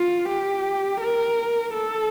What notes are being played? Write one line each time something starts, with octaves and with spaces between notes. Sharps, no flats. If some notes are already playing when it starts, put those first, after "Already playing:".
Already playing: F4
G4
A#4
A4